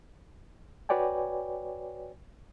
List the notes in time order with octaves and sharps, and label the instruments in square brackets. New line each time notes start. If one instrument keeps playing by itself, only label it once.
[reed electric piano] F#4 B4 C#5 D5 G5 G#5